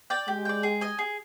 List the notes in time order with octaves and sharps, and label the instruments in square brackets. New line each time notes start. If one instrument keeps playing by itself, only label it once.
[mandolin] D5 G5
[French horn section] G#3 [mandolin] G4
[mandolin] D5 G5
G#4
D#5 G#5
G#4